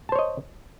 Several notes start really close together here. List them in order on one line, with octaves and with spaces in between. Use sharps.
A5 C5 C#5 D#5